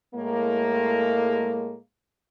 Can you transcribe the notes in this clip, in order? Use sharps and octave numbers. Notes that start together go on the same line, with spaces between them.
A2 G#3 A#3